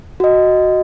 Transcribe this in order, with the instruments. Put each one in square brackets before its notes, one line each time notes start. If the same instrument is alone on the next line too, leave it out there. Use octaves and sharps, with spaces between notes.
[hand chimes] F#4 D#5